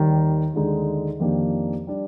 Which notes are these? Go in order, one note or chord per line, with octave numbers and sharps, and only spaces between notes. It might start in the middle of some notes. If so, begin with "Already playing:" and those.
Already playing: D#2 D#3 G3
D#2 D3 G#3 D#4
F2 D#3 A#3 D4 G4
G3 D4